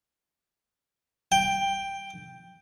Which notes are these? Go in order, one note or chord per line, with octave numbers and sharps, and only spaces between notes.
G5